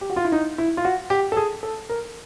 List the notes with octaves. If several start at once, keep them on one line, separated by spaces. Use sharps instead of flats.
G4
F#4
F4
E4
D#4
E4
F4
F#4
G4
A4
G#4
A4
A#4